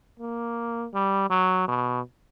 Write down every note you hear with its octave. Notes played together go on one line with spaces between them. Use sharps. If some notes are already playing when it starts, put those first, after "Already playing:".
A#3
G3
F#3
B2